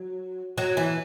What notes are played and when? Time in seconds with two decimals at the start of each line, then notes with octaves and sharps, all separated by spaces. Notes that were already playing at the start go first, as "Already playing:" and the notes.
Already playing: F#3
0.58 F#3
0.77 E3